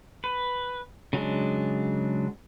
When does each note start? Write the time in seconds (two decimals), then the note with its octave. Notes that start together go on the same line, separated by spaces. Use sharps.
0.24 B4
1.13 C#3 F#3 G#3 D4